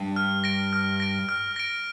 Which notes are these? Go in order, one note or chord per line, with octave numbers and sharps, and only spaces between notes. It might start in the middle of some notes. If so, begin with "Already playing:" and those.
Already playing: G2
F6
A#6 D7
F6
A#6 D7
F6
A#6 D7